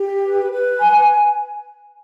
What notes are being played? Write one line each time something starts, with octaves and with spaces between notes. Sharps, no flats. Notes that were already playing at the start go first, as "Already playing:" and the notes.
Already playing: G4
B4
B4
G#5